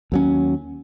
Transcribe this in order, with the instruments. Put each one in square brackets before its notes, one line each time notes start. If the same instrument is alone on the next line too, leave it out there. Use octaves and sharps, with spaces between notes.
[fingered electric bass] D#2 F#3 C#4